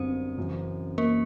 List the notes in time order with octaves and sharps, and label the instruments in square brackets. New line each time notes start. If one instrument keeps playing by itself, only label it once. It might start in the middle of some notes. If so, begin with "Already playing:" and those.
Already playing: [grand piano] F#2 D3 G3 B3 [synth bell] C4 C5
[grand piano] F#2 C#3 E3
[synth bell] A#3 A#4